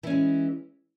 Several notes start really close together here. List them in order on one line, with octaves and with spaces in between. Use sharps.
E3 C#4 G#3